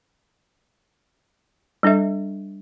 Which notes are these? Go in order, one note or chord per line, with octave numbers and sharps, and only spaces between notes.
G3 D4 A4 E5